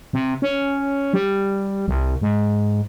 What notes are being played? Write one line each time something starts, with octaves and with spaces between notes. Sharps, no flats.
C3
C#4
G3
C2
G#2